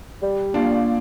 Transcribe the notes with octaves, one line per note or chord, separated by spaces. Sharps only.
G3
A#3 D4 F4